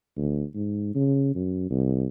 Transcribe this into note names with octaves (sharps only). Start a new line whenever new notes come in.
D2
G#2
C#3
F#2
C2